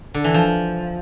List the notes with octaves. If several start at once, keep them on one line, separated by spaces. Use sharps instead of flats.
D3
E3
F3